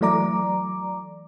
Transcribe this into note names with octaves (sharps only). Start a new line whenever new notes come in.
E3 F#3 A3 D5 A#5 D6